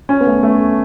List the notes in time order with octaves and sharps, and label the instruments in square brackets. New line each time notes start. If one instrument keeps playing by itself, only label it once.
[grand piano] C#4
B3
A3
A3